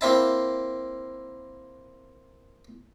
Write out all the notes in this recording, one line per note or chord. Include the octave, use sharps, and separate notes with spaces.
A#3 C4 E4 A5